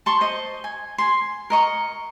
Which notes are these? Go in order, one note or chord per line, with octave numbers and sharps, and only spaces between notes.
A5 C6 C#6
C5 D#5
G#5
G#5 C6
A#4 D#5 C#6